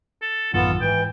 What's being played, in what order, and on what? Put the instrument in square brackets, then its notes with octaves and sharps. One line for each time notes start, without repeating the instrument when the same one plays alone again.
[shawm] A4
[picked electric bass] A1 F#2 D#3 [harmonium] B3 F4 [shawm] A4
[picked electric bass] G#2 [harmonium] E3 [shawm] G5